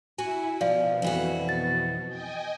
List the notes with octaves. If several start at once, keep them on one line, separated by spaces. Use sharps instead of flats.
E4 F#4 G#5
B2 F3 D5 F5
F2 E3 F#4
A6
D#5 G5 G#5